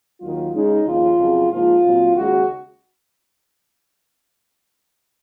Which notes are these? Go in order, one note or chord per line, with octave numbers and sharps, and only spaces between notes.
D#2 D#3 F#3 F4
C#3 G#3 C#4 D#4
D#2 C#3 F3 F4
F2 C#3 F#3
G#2 F3 A#3 F4
A#2 F#3 C4
D#2 C#3 G#3 F#4